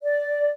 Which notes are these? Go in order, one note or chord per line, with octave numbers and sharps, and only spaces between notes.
D5